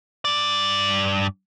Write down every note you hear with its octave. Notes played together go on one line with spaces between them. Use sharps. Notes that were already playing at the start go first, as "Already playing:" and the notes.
G2 D5